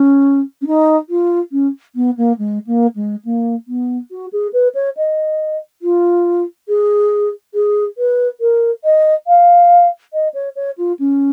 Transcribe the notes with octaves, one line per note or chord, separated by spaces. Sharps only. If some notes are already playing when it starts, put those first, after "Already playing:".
Already playing: C#4
C#4
D#4
F4
C#4
B3
A#3
G#3
A#3
G#3
A#3
B3
F#4
G#4
B4
C#5
D#5
F4
G#4
G#4
B4
A#4
D#5
F5
D#5
C#5
C#5
F4
C#4